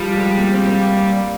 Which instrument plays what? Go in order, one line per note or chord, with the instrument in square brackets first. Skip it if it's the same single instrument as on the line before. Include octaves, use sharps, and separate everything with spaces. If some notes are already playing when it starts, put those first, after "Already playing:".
Already playing: [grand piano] F3 [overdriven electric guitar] G3
[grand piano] G#3
A#3
C4
A#3